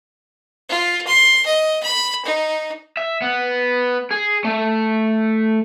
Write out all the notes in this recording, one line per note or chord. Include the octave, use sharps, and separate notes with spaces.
F4
C6
D#5
B5
D#4
E5
B3
G#4
A3